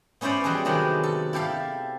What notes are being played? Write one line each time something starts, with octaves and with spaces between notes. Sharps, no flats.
B3 C#4 E4 C5 D5
G3 G#3 F#4 G#4 A4
C3 D#3 F#3 G#3 B3 D4
A4
E4 G4 A4 F5